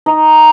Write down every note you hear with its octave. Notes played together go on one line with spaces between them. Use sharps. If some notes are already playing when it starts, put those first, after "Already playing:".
D#4